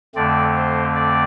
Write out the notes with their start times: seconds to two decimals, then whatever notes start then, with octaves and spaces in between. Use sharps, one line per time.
0.15 F2 D3 A3 C4 D5
0.55 C5
0.95 D5